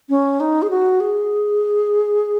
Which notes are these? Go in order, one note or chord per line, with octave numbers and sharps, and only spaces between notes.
C#4
D#4
G#4
F#4
G#4